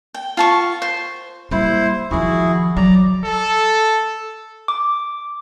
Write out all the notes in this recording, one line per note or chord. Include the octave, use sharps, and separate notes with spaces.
G5
F4 A5 C#6
C5
G3 A#3 E4 C5
D#3 F3 E4 F#4 G#4
F#3 D5 A#5
A4
D6